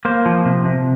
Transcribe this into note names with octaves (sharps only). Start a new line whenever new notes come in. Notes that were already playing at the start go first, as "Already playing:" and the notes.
A#3 C5
F3
C3
C3